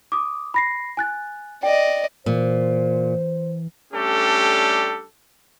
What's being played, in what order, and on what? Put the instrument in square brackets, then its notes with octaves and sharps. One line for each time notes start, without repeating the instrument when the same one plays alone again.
[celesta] D6 D#6
B5 A#6 C7
G#5 F#6 A6
[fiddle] D5 D#5 [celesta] G5
[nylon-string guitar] A#2 [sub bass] E3 [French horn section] C5
[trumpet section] G3 A3 C#4 D4 G4 A4